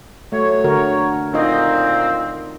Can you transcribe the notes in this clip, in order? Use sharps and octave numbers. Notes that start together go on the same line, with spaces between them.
F#3 A3 C#5
D3 F#4 A#4
A#2 C4 D#4 D#5